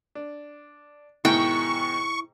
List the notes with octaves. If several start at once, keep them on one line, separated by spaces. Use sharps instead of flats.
D4
G#2 B2 D#3 E4 G5 C#6